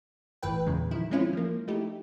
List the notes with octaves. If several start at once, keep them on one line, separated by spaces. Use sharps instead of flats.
G#1 A2 E3 B4 G5
E2 A#2 C#3 G#3
D#3 F3 E4
F3 G#3 C4 C#4 E4 F4
F3 A#3
A3 D#4 E4 G4